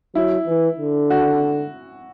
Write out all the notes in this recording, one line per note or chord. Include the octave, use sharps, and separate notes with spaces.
F#3 E4
E3
D3
F#4